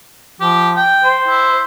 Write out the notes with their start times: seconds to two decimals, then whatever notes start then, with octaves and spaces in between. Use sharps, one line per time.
0.41 F3 G4
0.76 G5
1.04 C5
1.28 E4